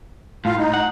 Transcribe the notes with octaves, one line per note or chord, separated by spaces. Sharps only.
A2 F4 F5
D#4
F#5